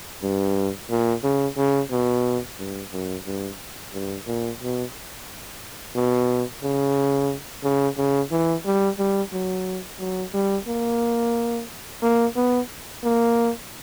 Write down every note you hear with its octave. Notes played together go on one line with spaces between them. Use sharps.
G2
A#2
C#3
C#3
B2
G2
F#2
G2
G2
A#2
B2
B2
C#3
C#3
C#3
E3
G3
G3
F#3
F#3
G3
A#3
A#3
B3
A#3